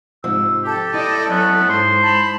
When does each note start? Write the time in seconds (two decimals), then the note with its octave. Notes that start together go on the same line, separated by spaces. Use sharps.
0.24 G#2 C3 F3 E6
0.64 G4 A4
0.94 E4 D5 D#5
1.30 F#3 B3 C#4
1.70 G#2 C5
2.02 A5 B5